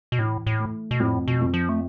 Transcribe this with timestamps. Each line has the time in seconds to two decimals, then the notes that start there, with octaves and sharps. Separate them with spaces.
0.12 B2
0.19 A2 E3
0.47 A2
0.59 A3
0.91 B2
1.00 F2 A2
1.28 B2
1.41 F2
1.54 F3
1.69 A3